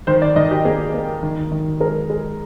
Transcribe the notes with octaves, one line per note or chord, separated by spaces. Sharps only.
D#3 C5
D5
D#3 D#5
G4
A#3 G#4
A#3
D#3
D#3
G#3 A#4
G#3